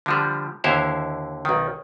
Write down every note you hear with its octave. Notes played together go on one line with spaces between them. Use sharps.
D3 F3 G3
D#2 D3 E4 C5 C#5
B1 D#3